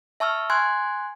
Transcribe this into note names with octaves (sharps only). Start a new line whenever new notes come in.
E5 A5 C#6 E6 F6
G#5 C6 F#6 G#6